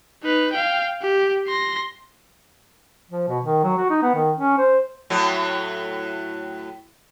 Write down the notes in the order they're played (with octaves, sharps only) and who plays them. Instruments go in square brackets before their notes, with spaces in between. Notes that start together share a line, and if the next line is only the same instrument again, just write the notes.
[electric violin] D#4 B4
F5 G5
G4
C6 A#6
[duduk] F3
B2
D#3
F#3
F#4
D#4
B3
D#3
C#4
C5
[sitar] A2 F#3